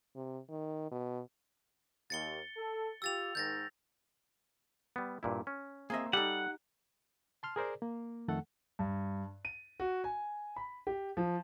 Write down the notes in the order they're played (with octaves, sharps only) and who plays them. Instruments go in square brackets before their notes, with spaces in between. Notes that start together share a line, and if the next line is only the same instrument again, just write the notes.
[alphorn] C3
D#3
B2
[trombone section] D#2 [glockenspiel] A6 C#7 G7
[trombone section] A4
[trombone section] F4 G4 [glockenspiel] E6 A6 F7
[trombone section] G#2 D#3 [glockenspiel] G6 A6 A#6
[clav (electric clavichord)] G3 B3
G2 A#2 E4
C#4
[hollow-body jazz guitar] A#3 C4 E5 [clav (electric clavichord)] G#4 D#5
[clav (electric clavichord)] G3 A4 [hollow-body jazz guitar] D#4 G4 [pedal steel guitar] F#5
[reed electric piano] A5 C6 F6
G#4 A#4 C5 D5
A#3
F2 D#3 A3 A4 F#5
[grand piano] G2
D#7
F#4
G#5
B5
G4
F3